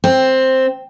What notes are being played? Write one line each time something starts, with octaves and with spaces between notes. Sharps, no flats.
C4